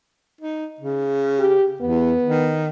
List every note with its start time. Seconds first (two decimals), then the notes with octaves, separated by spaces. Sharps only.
0.41 D#4
0.81 C#3
1.39 G4
1.81 E2 B3
2.23 D#3